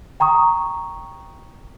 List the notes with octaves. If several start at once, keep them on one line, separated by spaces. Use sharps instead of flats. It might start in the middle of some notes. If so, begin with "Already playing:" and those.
G5 A#5 C#6 D#6